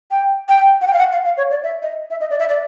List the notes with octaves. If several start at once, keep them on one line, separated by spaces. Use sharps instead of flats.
G5
G5
F#5
G5
F5
F#5
F5
F5
C#5
D5
E5
D#5
E5
D#5
D5
E5
D5